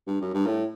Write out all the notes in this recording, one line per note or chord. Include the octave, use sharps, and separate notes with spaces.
G2
F#2
G2
A2